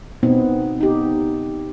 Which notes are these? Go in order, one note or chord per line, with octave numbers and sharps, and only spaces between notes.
B2 B3 C4 D#4
D#4 G4